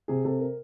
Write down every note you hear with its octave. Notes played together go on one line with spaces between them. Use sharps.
C3 G#4
C3 A4
A#4